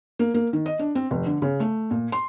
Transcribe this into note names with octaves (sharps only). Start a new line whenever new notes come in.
A#3
A#3
D#3
D#5
D4
C4
F1
D3
C#3
A3
A#2
C6